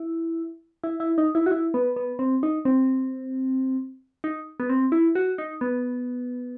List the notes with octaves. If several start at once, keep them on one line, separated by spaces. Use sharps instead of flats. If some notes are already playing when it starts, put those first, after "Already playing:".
Already playing: E4
E4
E4
D#4
E4
F#4
E4
B3
B3
C4
D#4
C4
D#4
B3
C4
E4
F#4
D#4
B3